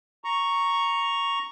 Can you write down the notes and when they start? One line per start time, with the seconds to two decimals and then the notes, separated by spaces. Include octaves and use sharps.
0.24 A#5 C#6